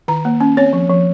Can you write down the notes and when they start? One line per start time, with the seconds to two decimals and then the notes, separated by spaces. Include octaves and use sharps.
0.08 D#3 A#5
0.25 A#3
0.41 C#4
0.57 C4 C#5
0.73 F3
0.90 F3